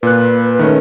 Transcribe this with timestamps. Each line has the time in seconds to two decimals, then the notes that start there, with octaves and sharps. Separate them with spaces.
0.03 A#2 B4 F#6
0.59 D#3 A3 C#4